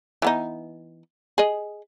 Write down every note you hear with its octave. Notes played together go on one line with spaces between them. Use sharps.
E3 B3 D#4
G#4 D#5